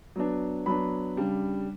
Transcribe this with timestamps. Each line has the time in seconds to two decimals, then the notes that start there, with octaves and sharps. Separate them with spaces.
0.16 F#3 B3 D4
0.66 F#3 B3 D4 B5
1.17 C#3 G3 D4